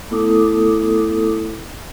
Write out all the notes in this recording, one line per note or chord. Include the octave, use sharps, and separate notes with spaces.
A3 B3 E4 A4 D6 D#6